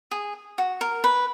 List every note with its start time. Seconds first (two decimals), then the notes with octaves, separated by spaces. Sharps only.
0.11 G#4
0.58 F#4
0.81 A#4
1.04 B4